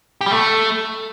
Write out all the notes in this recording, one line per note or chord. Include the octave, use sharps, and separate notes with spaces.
G4
G3
A3